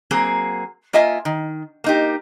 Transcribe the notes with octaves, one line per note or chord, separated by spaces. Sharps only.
F#3 A#3 C4 G#4
A#3 F4 D#5 E5 G#5
D#3
A#3 D#4 G4